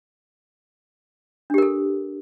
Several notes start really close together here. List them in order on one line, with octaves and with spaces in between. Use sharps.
D4 G4 A#4 A4